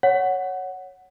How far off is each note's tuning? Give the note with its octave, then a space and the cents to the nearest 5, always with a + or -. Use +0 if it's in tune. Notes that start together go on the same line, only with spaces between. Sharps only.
C#5 +0 F#5 +0